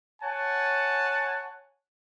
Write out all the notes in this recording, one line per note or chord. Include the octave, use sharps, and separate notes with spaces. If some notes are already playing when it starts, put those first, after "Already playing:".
C#5 F#5 G#5 A5